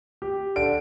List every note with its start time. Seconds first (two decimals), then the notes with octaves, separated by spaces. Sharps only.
0.22 G4
0.56 D3 D7